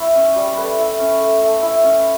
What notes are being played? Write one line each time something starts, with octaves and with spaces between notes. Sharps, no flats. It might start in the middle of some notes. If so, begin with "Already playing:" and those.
Already playing: E4 B4 C#5
C#4
G3
A3 B4
E4
C#4
A3
A3
E4
C#4